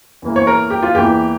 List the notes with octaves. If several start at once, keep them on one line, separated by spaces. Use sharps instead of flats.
E2 E3 A#3
C#5
A#4
G4
F4
E2 E3 A#3 G4